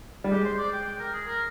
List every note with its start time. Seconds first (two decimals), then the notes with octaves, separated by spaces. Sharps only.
0.24 G3
0.31 G#3 G4
0.45 C5
0.59 D5
0.72 G5
0.85 G5
0.99 A#4
1.13 G#4
1.27 A#4